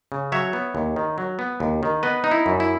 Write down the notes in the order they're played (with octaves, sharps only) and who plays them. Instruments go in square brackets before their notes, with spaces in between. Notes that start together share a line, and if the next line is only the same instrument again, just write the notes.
[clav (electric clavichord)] C#3
F#3 C#5 E5
B3
D#2
D#3
F#3
B3
D#2
D#3
B3 B4 D#5
D#4
E4
F#2
E4